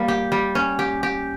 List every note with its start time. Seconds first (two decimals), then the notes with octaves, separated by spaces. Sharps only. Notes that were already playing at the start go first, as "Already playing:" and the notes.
Already playing: G3 A#3
0.08 G4
0.32 G3
0.55 C#4
0.79 G4
1.03 G4